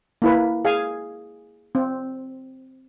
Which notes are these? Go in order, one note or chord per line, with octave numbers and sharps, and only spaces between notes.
A#3 E4 B4
G#4 F5 G#5
C4